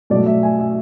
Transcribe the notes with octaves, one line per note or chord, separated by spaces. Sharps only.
B2 F#3 A3 D5
E5
G#5
E5